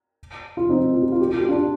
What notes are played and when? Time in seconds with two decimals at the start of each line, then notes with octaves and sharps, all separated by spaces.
0.57 F4
0.69 C4 D#4
0.94 F4
1.02 G4
1.12 F4
1.21 G4
1.31 F4
1.39 G4
1.48 D4 F4